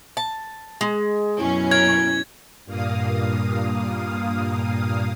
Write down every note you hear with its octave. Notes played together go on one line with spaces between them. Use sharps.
A5
G#3
F#2 B2 C#4 E4
A#4 G#6
G2 A#2 A#3 F5 D#6